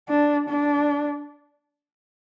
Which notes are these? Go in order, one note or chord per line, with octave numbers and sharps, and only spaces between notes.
D4
D4